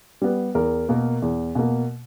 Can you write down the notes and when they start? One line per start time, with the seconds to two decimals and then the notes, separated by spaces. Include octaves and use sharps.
0.22 G3 B3
0.55 E2 A#4
0.89 B2 A#3
1.22 E2
1.55 B2 A#3